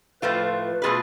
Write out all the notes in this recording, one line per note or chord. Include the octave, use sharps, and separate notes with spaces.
A2 F3 A3 F4 B4
B4
B2 A3 F4 G#4 B4